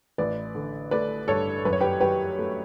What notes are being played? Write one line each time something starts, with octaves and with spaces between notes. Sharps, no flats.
A1 B4 D5
D3
A3 B4 D5
G2 A4 C#5
F#2 B4
C#5
G4 B4
F#3 G4 B4
A3